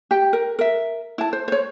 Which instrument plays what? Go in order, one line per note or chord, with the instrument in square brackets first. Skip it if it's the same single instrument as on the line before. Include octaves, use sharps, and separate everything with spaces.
[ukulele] G4 G5
A#4
A#4 E5
E4 A5
C5
C5 C#5